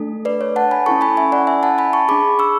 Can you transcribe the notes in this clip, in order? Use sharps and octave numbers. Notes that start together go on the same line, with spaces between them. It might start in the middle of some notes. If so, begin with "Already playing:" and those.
Already playing: A3 D4 A4
B4 D5
C#5
F#5 A5
G#5 B5
C#4 E4 A4 A5 C#6
G#5 B5
E5 G#5
D5 F#5
E5 G#5
F#5 A5
G#5 B5
A5 C#6
D4 G#4 B5 D6
C#6 E6